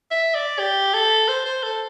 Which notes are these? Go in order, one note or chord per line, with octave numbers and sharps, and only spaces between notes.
E5
D5
G4
A4
C5
C5
A4